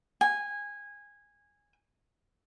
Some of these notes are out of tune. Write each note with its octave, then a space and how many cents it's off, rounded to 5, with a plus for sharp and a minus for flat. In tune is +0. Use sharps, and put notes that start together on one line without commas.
G#5 -15